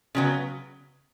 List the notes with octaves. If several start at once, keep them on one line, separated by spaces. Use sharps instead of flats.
C#3 F#3 B3